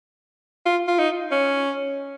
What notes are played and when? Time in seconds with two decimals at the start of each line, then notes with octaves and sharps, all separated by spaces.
0.66 F4
0.88 F4
0.99 D#4
1.32 C#4